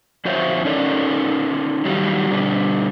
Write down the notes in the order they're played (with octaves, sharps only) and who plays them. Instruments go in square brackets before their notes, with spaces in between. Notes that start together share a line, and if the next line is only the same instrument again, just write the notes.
[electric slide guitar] F2 F#4 C5 C#5 E5
C#4 D#4 A4 A#4 C#5 D5
D#3 F#3 G3
B2 D3 G3